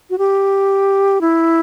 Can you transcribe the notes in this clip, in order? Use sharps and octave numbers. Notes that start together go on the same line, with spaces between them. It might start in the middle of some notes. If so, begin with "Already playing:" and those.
F#4
G4
E4